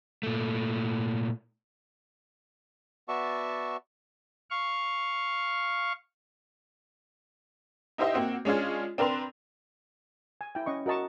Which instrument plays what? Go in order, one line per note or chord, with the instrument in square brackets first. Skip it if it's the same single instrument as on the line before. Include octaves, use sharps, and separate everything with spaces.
[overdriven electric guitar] A#2 A3
[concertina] B3 F#4 D5 E5 A5 C#6
[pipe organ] F5 C#6
[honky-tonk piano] D#4 E4 G4 C5 D#5 E5
A#3 C4 F#4
G#3 C#4 D4 F4 G#4
C4 D4 A#4 B4 C6 F7
[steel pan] G#5
E4 G5
C#4 D#5 C#6
F#4 A#4 D#5 A5 C#6